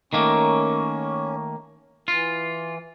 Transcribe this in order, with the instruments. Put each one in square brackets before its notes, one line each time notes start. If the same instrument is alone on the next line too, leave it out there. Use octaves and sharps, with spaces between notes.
[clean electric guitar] D#3 A3 A#3 [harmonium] C#4
[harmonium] E3 [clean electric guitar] F4